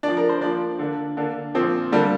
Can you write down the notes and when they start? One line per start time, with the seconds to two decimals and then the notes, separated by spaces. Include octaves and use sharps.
0.03 D4 D5
0.08 F3
0.17 A#4
0.29 C5
0.41 F3 A#3 D4 D5
0.79 D3 A#3 D4
1.17 D3 A#3 D4
1.55 A#2 F3 C4
1.92 D3 G3 A#3 D4